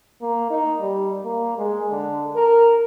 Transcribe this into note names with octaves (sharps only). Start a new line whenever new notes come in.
A#3
D#4
G3
A#3
G#3
D3
A#4